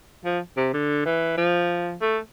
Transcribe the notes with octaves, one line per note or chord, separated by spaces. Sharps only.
F3
C3
D3
E3
F3
A3